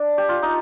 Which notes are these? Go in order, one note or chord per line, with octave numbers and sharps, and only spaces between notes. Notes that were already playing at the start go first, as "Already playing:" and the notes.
Already playing: D4
G4
F4
D#4